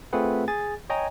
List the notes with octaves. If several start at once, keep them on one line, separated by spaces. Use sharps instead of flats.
A3 C4 F4 G#4 B4 F#5
G#4 G#5 A6
C#5 D#5 G5 G#5 A#5